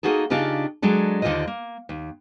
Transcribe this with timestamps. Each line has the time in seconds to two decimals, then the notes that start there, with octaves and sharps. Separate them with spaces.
0.03 A#3 C4 D#4 F#4 G#4 A4
0.30 C#3 D4 D#4 F4 G4
0.82 F#3 G#3 D4 A4
1.22 D#2 D3 E3 F4 C5 D#5
1.47 A#3
1.89 D#2